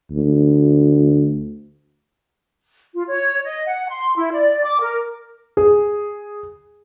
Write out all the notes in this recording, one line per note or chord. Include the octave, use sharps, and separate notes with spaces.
D2
F4
C#5
D#5
F#5
C6
E4
D5
D6
A#4
G#4